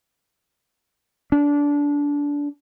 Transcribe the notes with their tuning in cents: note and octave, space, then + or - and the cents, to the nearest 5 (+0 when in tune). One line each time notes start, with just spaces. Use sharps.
D4 -20